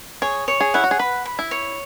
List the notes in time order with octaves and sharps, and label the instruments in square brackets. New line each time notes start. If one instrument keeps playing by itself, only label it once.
[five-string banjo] G#4 [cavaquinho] C#5
[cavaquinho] C#5
[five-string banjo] G#4
[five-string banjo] E4 [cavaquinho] F#5
[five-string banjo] F#4
G#4
[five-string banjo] B4 [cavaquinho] B5
[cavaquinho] B5
[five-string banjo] E4
[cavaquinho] C#5